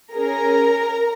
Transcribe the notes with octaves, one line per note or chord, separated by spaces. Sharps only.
C#4 G#4 A#4 A#5